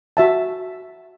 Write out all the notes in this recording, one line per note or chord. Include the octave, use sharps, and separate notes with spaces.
F#4 E5 A5